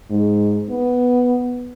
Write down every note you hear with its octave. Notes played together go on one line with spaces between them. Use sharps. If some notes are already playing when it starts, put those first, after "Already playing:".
G#2
B3